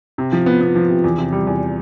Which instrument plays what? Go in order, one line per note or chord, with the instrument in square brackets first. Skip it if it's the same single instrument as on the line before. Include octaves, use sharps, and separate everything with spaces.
[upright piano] C3
F3
B3
B3
F3
C3
E2
C3
G3
E2